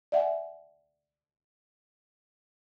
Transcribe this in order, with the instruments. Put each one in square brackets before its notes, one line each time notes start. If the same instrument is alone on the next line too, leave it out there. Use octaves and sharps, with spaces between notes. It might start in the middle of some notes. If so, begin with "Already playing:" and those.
[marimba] D5 E5 F#5 G#5